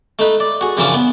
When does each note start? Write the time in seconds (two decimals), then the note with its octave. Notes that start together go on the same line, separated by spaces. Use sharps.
0.19 A3 D#4 B4
0.40 D5
0.61 F#4 G#4
0.77 F#2 C#3 E3 F3 C#4 D4
0.94 B3